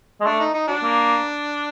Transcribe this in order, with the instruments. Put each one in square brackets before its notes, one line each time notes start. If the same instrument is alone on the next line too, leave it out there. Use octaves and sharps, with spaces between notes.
[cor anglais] G#3
[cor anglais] A3 [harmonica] D4
[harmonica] D#4
D#4
F#3 D4
[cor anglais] A#3